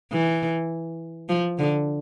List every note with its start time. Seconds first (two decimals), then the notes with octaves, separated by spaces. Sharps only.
0.12 E3
1.29 F3
1.58 D3